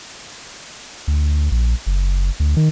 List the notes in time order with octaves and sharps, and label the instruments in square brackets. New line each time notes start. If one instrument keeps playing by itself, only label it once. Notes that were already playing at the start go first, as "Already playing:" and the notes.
[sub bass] D2
A#1
F#1
D2
D#3